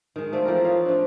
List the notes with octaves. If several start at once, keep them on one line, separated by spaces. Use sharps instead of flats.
D#3 G#3
A3 C4 D5 F5
E3 F3 G4 A#4
F4 C#5 D#5 F5
A3 C4 D4